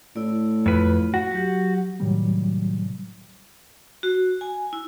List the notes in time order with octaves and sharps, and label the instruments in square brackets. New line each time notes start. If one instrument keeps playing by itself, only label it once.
[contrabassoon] A2 [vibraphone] E4 D5
[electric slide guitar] F2 B4 [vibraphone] F4
[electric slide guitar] F#4
[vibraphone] F#3 G4
[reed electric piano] A2 C3 D#3 F#3 G3
[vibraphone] F#4
G#5
E4